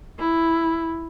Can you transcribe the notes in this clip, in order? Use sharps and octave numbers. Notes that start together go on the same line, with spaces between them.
E4